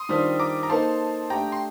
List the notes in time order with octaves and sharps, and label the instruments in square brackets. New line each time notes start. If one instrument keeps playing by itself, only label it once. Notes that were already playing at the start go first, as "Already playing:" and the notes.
Already playing: [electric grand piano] C6 D#6
[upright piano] D#3 G3 D4 F4 C5
[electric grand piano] A#5 D6
A#5
[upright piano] A#3 D#4 A4 C5 [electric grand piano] A5 C6
[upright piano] A3 D4 G4 [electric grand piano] G5 A#5
[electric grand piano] C6